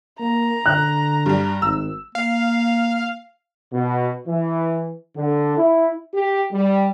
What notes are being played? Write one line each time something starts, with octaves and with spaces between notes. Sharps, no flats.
A#3 A#5
D3 F#6
G2 G3
G#1 E6
A#3 F5
B2
E3
D3
E4
G4
G3